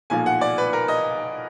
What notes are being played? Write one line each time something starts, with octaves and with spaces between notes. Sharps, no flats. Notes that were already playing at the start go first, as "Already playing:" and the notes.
B1 A#2 F3 G#5
F#5
D5
B4
A#4
D#5